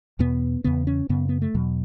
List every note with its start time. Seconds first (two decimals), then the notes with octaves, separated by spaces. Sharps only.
0.19 E2 B2 B3
0.64 E2 C#3 B3
0.87 C#4
1.09 F#2 C#3 B3
1.29 B3
1.42 A3
1.54 E2 B2 F#3